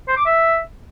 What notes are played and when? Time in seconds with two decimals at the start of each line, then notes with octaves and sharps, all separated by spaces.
0.08 C5
0.17 D6
0.26 E5